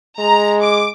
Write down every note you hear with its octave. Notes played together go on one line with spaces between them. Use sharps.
G#3 A#5
D6